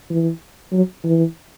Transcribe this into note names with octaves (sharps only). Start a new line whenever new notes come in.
E3
F#3
E3